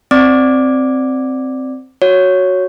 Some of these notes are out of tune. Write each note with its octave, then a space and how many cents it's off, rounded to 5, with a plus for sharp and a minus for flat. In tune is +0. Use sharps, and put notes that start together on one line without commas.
C4 +0 D5 +0 D6 +0
F#4 +0 C#5 +0